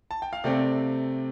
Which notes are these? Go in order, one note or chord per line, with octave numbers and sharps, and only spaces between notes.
A5
G5
F5
C3 A3 C4 D5